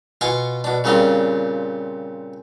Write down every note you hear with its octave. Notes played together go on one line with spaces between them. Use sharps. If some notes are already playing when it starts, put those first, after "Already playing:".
B2 F4 F5 G#5 C#6
B2 D4
A#2 C#3 G3 C4 F4